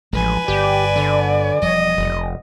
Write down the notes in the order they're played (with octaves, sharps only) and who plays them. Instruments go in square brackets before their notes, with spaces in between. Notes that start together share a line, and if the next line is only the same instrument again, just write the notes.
[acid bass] A1 [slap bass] F3 F#3 G#3 [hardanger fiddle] B4 G#5
[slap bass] G1 [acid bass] G4 [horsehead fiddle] D5
[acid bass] D3
[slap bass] E1 F3 G3 [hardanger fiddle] D#5
[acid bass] F1